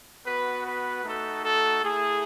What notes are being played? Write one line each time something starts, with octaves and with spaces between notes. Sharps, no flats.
B3 F#4 B4
B4
A3 D#4 F#4 A4
A4
A3 E4 G#4